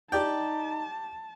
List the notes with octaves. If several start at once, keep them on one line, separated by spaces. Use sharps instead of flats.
D#4 G4 D5 G5 A5